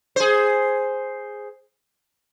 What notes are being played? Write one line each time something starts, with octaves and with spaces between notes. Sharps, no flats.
G#4 C5